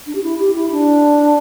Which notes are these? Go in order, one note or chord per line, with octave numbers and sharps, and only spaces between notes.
D4
G4
E4
G4
E4
D4